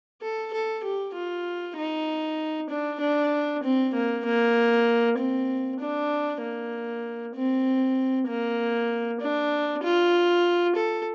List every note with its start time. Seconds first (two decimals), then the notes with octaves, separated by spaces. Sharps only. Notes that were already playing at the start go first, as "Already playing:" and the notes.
0.21 A4
0.53 A4
0.83 G4
1.14 F4
1.76 D#4
2.69 D4
3.00 D4
3.63 C4
3.94 A#3
4.25 A#3
5.17 C4
5.80 D4
6.41 A#3
7.35 C4
8.27 A#3
9.20 D4
9.83 F4
10.75 A4